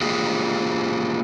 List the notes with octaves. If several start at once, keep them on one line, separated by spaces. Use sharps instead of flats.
A#3 F4 G4 G#4